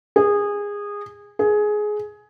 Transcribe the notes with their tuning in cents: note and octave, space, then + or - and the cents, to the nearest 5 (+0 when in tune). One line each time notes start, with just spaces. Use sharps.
G#4 -20
G#4 +15